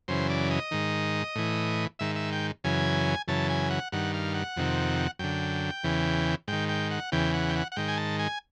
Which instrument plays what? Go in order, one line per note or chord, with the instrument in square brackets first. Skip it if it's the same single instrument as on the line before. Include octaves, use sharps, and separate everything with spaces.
[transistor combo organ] F#2 C#3 E3 C5
D5
D#5
G#2 D#3
A2 E3
G#2 D#3 E5
E5
G5
F#2 C#3 E3 G#5
F#2 C#3 E3 A5
G#5
F#5
G2 D#3 F#5
F5
F#5
F2 C3 D#3
F#2 D3 G5
E2 C#3 E3
G#2 D#3 G5
G5
F#5
E2 C#3 E3 G5
F#5
G5
F#5
F#5
G#2 D#3 G5
G#5
A5
G#5